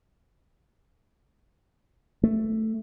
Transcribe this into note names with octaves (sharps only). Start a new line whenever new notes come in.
A3